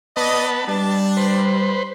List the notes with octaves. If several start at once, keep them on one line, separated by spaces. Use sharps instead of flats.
B3 B4 D5 D#5 A5
G3 D4 A5
B4 C5